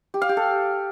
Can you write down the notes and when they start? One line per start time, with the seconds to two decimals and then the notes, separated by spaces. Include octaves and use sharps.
0.14 G4
0.22 F5
0.29 G4
0.37 A4